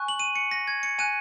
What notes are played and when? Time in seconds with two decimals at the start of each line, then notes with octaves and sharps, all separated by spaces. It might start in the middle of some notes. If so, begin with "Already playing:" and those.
Already playing: G#5 C#6 F#6
0.08 F#7
0.20 D#7
0.35 C#7
0.51 A#6
0.67 G#6
0.83 C#7
0.99 G#5 F#6 D#7